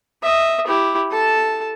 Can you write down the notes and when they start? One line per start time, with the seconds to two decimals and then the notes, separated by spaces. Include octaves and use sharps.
0.22 D#5 E5
0.67 E4 G4
1.11 A4 A5